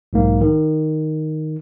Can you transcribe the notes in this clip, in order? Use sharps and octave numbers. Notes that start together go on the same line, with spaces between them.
B1 G#2 A#3
D#3